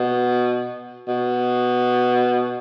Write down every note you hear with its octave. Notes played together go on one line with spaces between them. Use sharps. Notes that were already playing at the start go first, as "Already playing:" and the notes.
Already playing: B2
B2